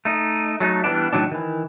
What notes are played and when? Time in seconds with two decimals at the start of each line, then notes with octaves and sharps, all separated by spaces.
0.05 A3 D#4
0.60 F#3 A3 D#4
0.84 E3 G3 B3 D4
1.13 A2 D#3 F#3 C4 D4
1.31 D#3 E3